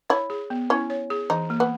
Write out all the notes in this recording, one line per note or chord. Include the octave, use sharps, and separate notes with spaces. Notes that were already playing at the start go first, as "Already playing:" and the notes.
E4 C#5
G#4
B3
C#4 E4
C#5
G#4
E3 D#4
A#3
B3